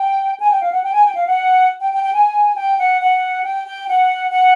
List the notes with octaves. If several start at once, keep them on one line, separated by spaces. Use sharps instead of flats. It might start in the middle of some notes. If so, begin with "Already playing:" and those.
Already playing: G5
G#5
G5
F5
F#5
G5
G#5
G5
F5
F#5
G5
G5
G5
G#5
G5
F#5
F#5
G5
G5
F#5
F#5